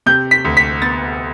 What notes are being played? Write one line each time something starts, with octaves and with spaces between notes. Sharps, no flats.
C3 G6
B6
D2
B6
B3 A6